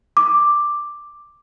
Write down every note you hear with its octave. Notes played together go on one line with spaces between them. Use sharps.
D6